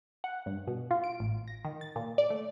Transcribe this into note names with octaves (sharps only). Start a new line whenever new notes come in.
F#5
G2
B2
F4
D7
A1
A#6
D#3
A6
A#2
D5
A3